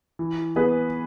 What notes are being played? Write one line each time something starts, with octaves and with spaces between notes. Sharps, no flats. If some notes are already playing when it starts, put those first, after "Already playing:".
E3
B3 G#4 B4